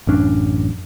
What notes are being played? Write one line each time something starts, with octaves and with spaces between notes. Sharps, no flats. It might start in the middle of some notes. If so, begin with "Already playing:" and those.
A1 F#2 C#4 D4